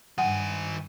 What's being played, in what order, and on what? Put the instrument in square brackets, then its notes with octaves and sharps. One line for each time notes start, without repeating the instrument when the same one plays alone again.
[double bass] G2 [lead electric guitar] D#3 G#5 [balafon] F#5